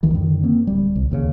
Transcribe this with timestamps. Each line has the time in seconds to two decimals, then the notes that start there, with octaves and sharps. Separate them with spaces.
0.03 D2 D#3 E3
0.14 F#2 D3 D#3
0.43 A#3 C4
0.67 D1 G3
0.96 C2
1.10 E1 D#2 A2 C#3